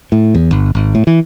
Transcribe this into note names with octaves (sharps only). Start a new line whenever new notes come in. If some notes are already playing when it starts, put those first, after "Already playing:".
A2
E2
G1
G#1
A2
E3